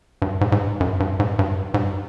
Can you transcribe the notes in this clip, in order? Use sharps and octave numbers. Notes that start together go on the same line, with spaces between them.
G2
G#2
G#2
G2
F#2
G2
G#2
G2
G#2
G2